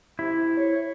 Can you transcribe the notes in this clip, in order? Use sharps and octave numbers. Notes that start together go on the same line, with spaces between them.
C3 E4
C#5